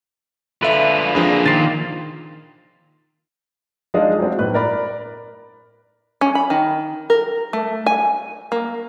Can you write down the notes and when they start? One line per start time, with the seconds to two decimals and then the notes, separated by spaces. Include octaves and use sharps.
0.63 D3 F4 A4 B4 E5
1.15 F3 A#3 C4 D4 G#4
1.46 A#2 D#3 F4 A6 C7
3.94 F3 G#3 D4 D#4 D#5 F5
4.19 F#3 A3 C4 D4
4.39 A2 B4 F#6
4.54 A#4 D5 B5
6.21 C#4
6.35 B5
6.50 D#3
7.10 A#4
7.53 A3
7.86 G#5
8.52 A#3